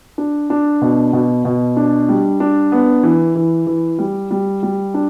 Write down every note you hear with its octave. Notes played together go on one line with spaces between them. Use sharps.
D4
D4
B2
B2
B2
D4
G3
D4
B3
E3
E3
E3
G3
G3
G3
D4